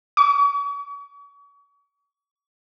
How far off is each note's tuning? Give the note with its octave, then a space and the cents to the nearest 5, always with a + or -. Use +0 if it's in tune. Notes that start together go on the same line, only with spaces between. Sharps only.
C#6 +40